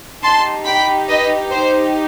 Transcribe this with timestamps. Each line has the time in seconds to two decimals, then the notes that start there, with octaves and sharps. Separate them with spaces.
0.22 D#4 G4 A5 C6
0.65 G5 B5
1.08 B4 D#5
1.51 C5